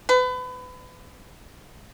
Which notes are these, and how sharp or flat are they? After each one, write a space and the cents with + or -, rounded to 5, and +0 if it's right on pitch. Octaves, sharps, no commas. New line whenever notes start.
B4 +30